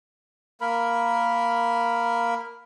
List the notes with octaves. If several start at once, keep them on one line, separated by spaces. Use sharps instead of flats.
A#3 A#4 B5